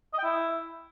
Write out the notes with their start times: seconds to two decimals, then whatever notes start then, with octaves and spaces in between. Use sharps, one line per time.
0.13 D#5
0.18 G5
0.24 E4